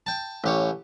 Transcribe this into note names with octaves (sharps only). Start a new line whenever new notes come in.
G5 A5
A1 G4 C#5